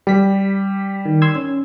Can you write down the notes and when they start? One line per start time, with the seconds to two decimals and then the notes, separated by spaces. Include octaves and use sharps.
0.07 G3 G4 B6
1.05 D#3
1.22 C6 E6 G#6
1.36 C#4